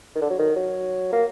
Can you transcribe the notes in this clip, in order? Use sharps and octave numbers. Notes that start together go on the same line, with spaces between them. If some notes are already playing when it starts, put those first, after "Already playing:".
D#3
D3
F#3
D#3
F#3
A#3